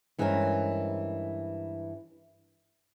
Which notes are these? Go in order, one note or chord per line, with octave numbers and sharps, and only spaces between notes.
G2 E3 G#3 C4 C#4 A#4